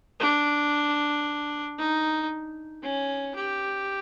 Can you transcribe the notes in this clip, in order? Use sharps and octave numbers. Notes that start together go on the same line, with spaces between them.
D4
D#4
C#4
G4